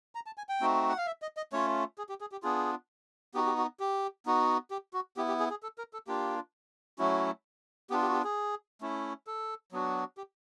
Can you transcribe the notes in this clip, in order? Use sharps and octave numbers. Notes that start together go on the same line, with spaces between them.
A#5
A5
G#5
G5
A3 C4 D#4 F#4
F#5
F5
E5
D#5
D#5
A3 C#4 F4 C#5
G#4
G4
G#4
G4
B3 D4 F4 G#4
B3 D#4 F#4 G4
G4
F#4
G4
B3 D#4 F#4
G4
F#4
B3 E4 G4
G4
G#4
G#4
A4
A#4
A4
A#3 D4 F4 G4
F#3 A3 C#4 E4 F#4
B3 D4 F4 G4
G4
F#4
G4
G#4
A3 C#4 E4
A4
F#3 B3 D4 F#4
G4